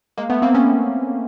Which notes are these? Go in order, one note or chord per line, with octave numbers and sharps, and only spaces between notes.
G#3 A#3
A3 B3
A#3 C4
B3 C#4